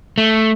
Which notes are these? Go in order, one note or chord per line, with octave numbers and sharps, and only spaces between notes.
A3